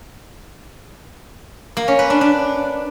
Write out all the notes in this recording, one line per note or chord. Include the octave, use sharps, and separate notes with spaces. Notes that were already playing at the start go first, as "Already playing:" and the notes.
A#3
C#4
B4
D4
D4